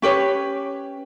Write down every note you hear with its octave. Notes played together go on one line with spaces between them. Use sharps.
C#4 G4 B4 C#5